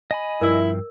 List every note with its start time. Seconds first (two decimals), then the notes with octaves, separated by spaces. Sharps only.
0.11 D#5 G#5 B5
0.41 G2 F3 E4 A#4 D5 E6